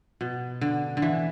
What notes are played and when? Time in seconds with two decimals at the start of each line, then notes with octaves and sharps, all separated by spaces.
0.21 B2
0.61 D3
0.97 D3
1.02 E3